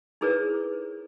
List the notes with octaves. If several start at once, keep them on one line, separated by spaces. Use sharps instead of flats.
D#4 E4 G#4 A#4 B4 C#5